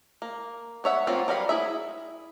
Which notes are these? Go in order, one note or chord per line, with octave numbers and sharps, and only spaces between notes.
A#3
B3 C#5 E5 F#5
F#3 A#3 C4 C#4 F4
F#3 G3 A#4 F5 B5
E4 G#4 E5